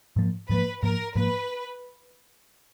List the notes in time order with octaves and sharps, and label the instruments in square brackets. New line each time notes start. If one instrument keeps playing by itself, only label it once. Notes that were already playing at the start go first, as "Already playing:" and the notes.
[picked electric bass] G#2 F3 A#3
[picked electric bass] G#2 F3 A#3 [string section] B4
[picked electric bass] G#2 F3 A#3 [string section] A#4
[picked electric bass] G#2 F3 A#3 [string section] B4